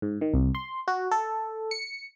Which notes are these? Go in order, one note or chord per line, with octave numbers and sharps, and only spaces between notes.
G#2
D#3
C2
C6
F#4
A4
C#7